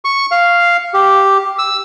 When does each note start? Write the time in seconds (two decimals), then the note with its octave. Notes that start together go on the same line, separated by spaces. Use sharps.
0.05 C#6
0.31 F5
0.94 G4
1.59 E6